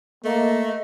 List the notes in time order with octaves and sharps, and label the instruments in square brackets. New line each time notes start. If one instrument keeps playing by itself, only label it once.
[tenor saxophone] A3 [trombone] A#3 [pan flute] D#5